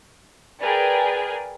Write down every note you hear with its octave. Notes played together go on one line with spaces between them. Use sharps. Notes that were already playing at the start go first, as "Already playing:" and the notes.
G#4 A#4 B4 D5 G5 G#5